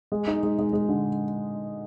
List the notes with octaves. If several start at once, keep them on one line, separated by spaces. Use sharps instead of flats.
G#3
D#4
G#3
G#3
G#3
D3